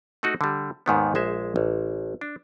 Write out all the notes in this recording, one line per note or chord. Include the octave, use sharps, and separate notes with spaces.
A3 D#4 F#4
D3 G3
D#2 G#2 D#3 B3
A#1 G#3 C5 E5
A1
D4